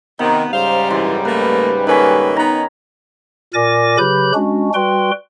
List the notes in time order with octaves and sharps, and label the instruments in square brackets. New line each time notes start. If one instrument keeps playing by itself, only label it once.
[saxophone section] C3 B3 [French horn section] D#3 [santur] D#4
[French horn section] G#2 C#3 G3 [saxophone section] C5 F5
[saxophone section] F#2 C3 E3 [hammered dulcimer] C6
[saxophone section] A3 A#3 [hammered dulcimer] B4
[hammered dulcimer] D#3 C#4 B5 [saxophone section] A#3 A4 B4
[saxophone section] B3 D#4 [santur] A#5
[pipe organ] A#2 A#4 D5 G#5 D6 A#6
C#3 F#3 G4 B4 B5 G6
G#3 C#4 D4 F#4
G3 F#4 B4 G5 C6